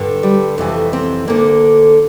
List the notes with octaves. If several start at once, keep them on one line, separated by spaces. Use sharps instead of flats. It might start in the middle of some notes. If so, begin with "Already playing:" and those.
Already playing: G2 D3
G3
F2 C3 E3 A3
C4
D2 D3 A#3